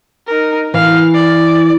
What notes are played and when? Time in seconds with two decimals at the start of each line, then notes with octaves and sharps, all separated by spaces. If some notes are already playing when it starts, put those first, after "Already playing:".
0.27 D#4 A#4
0.74 E3 F5
1.14 D5